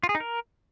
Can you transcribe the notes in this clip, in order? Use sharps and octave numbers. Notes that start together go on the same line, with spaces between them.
F4
G#4
D#4
A#4